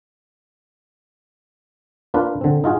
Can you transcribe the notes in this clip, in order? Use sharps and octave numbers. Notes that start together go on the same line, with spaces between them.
A#3 D4 F4 B4
D3 C4
D#4 F4 F#4 G#4